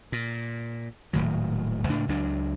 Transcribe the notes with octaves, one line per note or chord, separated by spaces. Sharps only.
A#2
D#1 A2 D#3 F#3
C#2 A2 D4
C#2 F#3 D4